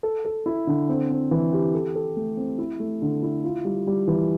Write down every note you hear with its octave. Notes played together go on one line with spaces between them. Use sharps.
A4
A4
E4
D3
C4
C4
E3
G4
A4
A4
A3
C4
E4
A3
D3
E4
F4
G3
G3
E3